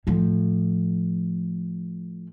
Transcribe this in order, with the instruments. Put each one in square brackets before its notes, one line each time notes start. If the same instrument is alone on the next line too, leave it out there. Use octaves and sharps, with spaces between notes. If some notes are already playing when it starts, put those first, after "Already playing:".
[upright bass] A2 F3